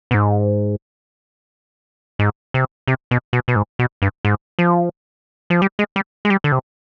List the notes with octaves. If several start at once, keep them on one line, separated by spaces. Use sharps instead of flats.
B2
G#2
G#2
C3
C3
B2
B2
B2
G#2
B2
G2
G#2
F3
F3
G3
G#3
G3
G#3
G3
D3
C3